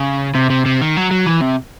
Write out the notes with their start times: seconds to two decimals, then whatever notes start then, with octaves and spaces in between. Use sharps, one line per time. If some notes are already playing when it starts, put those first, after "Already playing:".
Already playing: C#3
0.35 C3
0.50 C3
0.66 C3
0.81 D#3
0.97 F#3
1.11 F#3
1.27 E3
1.41 C3